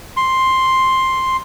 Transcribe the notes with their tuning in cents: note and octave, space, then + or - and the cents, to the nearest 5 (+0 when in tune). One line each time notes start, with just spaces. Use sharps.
C6 +5